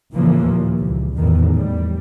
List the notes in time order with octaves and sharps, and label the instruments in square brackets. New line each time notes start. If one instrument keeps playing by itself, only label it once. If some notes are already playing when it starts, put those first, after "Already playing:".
[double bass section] A1 C#3 E3 F3 A#3
D#2 A#2
C#2
E2 A2 D#3
G3